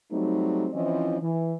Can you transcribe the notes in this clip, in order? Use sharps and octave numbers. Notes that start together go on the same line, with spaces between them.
F#3 G3 A3 C4 D#4
E3 F3 C4 C#4 E4 D#5
E3